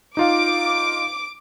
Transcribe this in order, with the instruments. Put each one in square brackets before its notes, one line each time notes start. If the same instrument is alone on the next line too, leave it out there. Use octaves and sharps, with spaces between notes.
[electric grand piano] D#4 F4 F5 [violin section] D6